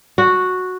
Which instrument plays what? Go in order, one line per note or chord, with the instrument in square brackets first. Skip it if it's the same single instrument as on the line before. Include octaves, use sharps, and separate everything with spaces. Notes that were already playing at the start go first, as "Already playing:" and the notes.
[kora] F#4